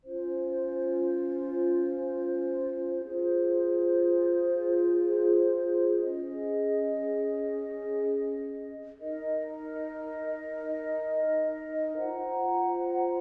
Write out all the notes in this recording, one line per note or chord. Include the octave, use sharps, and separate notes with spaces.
C#4 F4 C5
F4 G#4 C5
C#4 G#4 D#5
D#4 A#4 D#5
F4 C5 F#5 A#5